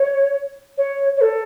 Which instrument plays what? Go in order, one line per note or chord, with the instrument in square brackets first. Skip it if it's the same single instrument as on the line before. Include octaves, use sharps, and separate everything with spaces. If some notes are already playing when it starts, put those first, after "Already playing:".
Already playing: [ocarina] C#5
C#5
C#5
A4